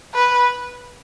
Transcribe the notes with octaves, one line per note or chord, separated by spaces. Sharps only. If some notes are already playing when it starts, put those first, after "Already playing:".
B4